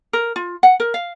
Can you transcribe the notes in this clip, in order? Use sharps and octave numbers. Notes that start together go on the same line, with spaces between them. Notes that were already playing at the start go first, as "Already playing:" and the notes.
A#4
F4
F#5
A#4
F5